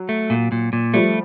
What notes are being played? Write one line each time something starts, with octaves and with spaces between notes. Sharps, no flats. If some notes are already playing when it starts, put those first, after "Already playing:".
Already playing: F#3
A3
A#2
A#2
A#2
F3 G3 A3